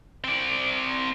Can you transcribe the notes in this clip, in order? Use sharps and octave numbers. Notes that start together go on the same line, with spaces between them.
C4 D5